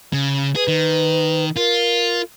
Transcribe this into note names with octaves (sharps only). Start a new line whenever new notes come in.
C#3
G#4 B4
D#3
F4 A#4